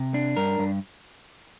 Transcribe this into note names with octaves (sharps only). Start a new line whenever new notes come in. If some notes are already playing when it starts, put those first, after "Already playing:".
Already playing: C3
D4
G2 A#4
G2